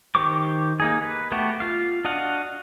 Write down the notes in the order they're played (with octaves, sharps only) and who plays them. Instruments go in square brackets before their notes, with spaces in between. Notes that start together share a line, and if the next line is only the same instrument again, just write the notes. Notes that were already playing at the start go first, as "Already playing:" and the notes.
[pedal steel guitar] D#3 G4 C5 C#6 D6
A#3 D#4 G#4
B4
A3 B3 F#4 G4
F4 F5
D4 F#4 D#5 F5 F#5